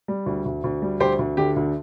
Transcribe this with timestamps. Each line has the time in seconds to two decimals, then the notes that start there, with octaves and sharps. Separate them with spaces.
0.08 G3
0.26 D2
0.46 D2
0.64 D2
0.82 G3
1.00 D2 G4 C5
1.19 D2
1.37 D3 G4
1.56 D2